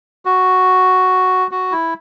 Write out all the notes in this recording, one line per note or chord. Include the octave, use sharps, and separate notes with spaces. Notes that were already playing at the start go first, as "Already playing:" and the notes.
F#4
F#4
E4